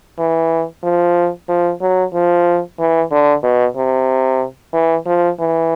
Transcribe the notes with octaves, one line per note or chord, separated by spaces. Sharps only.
E3
F3
F3
F#3
F3
E3
D3
B2
C3
E3
F3
E3